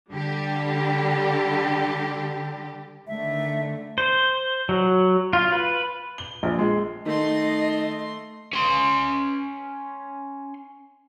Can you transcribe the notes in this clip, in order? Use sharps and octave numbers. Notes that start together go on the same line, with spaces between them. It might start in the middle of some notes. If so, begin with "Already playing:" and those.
D3 G3 G4
D3 D#3 A3 E5
C5
F#3
F4
B4
G7
A#1
G#3
D#3 A3 D#5 C6
C#4 C6